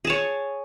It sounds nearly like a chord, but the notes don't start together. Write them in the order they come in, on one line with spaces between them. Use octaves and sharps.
G#4 A5 C#5